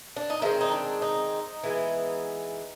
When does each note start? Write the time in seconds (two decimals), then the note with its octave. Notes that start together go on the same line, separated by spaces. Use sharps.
0.16 D4
0.30 D#4
0.42 D#3 G#3 C4 E4
0.61 D#4
0.72 D4
1.02 D#4
1.64 E3 G#3 B3